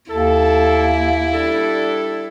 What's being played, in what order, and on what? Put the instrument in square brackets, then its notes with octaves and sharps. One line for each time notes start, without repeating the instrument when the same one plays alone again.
[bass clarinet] D#2 [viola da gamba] E4 [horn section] A4
[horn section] G3 D4 A4